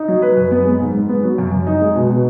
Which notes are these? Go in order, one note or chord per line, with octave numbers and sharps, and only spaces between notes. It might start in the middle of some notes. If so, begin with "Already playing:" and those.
Already playing: D#4
F#3
B4
F#2
B3
G#3
G#2
G#2
B3
F#3
F#2
F#2
D#4
G#3
B2
B2